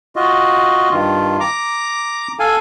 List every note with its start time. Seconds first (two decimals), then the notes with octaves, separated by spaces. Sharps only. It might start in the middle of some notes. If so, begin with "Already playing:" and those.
0.16 F4 F#4 D#5
0.91 G2 D#3 F4
1.40 A#5 D6
2.40 A4 F5 G#5